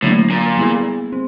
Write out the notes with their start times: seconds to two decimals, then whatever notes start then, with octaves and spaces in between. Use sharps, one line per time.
0.02 A2 D3 F#3 A#3 D4
0.30 A#2
0.57 G3 B3 E4 G#4
1.13 C4